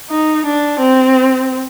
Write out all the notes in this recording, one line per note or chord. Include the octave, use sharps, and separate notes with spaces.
D#4
D4
C4